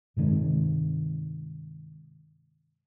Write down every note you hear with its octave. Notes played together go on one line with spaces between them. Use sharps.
G2 C3 D#3 G#3